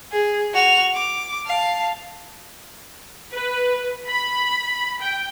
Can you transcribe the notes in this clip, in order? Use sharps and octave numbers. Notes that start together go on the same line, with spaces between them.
G#4
F#4 F7
D6
F5 A5
B4
B5
G5